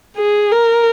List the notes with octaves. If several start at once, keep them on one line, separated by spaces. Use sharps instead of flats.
G#4
A#4